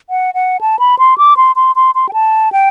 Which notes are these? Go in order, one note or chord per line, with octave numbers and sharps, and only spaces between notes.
F#5
F#5
A5
B5
C6
D6
C6
C6
C6
C6
G5
A5
G5